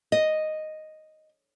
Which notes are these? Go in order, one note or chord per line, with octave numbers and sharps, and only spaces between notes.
D#5